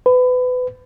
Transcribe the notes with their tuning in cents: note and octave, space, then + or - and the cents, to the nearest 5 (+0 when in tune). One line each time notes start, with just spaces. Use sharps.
B4 +25